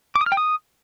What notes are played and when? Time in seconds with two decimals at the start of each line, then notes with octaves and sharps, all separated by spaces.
0.16 D6
0.21 D#6
0.26 F6
0.32 G5
0.37 D#6